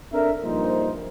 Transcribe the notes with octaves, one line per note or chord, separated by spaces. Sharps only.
C4 D4 A4 A#4 E5
A#1 G2 A#2 D#4 C5